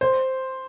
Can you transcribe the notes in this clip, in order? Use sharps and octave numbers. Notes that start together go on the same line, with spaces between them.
C5